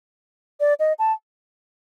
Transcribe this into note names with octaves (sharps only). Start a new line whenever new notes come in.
D5
D#5
A5